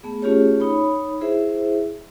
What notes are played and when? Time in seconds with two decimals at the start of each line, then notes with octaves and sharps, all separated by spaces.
0.03 A3 B3 G#4
0.22 A3 C#4 F4 G4 G#4 C#5
0.60 D#4 C#5 B5
1.21 E4 G#4 C5 E5